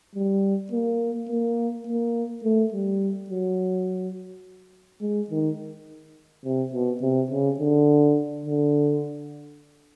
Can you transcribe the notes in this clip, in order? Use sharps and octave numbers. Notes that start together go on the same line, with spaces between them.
G3
A#3
A#3
A#3
A3
G3
F#3
G#3
D#3
C3
B2
C3
C#3
D3
D3